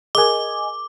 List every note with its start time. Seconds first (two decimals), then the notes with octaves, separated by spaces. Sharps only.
0.15 G#4 A#4 D#5 G#5 D6